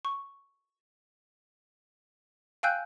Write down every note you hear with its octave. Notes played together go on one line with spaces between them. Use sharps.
C#6
F5 G5 G#5 E6 F#6 G6